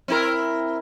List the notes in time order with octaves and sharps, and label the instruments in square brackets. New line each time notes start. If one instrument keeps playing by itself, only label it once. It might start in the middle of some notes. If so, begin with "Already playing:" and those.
[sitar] C4 E4 A#4